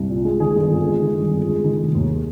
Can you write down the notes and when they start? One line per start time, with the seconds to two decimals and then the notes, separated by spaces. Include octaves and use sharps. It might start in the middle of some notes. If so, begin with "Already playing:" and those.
Already playing: C2
0.09 A#2
0.25 G#3
0.40 D#3 G#4
0.56 G1
0.72 F2
0.86 G#3
1.02 D#3
1.18 G1
1.33 F2
1.48 G#3
1.64 D#3
1.80 F1
1.95 D#2